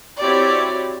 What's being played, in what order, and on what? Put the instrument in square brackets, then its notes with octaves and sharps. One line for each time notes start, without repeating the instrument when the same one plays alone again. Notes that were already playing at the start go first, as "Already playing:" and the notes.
[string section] C4 E4 F#4 G4 C#5 D5